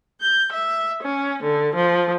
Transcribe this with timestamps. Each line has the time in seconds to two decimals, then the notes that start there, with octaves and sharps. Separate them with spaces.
0.20 G6
0.52 E5
1.02 C#4
1.43 D3
1.74 F3